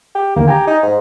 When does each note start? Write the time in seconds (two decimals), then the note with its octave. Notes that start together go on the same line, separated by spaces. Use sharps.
0.15 G4
0.36 D#2 D3 A#3
0.48 G4 G#5 A#5
0.67 D#4
0.83 G#2